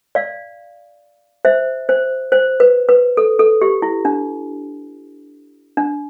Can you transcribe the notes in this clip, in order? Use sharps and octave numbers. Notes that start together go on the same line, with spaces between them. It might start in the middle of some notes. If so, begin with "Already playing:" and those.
D5 F5
C5 E5
C5
C5
B4
B4
A4
A4
G4
E4
D4
D4